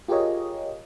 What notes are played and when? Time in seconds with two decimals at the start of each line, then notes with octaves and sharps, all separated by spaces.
0.08 F4 G4 G#4 A#4 C#5 D#5